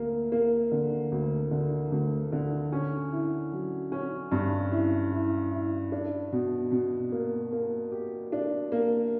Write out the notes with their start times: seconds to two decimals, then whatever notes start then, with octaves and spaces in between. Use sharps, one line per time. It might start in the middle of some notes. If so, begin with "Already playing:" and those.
Already playing: D2 A#3
0.32 A#3
0.71 D3
1.12 D2
1.51 D3
1.92 D2
2.32 D3
2.72 C#4
3.12 E4
3.52 F#3
3.92 C#4
4.32 G2
4.72 E4
5.12 E4
5.51 E4
5.92 D4
6.32 B2
6.72 B2
7.12 A#3
7.52 A#3
7.92 G4
8.32 D4
8.72 A#3